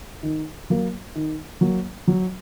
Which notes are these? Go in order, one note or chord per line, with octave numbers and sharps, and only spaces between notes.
D#3
F#3 A#3
D#3
F#3 A#3
F#3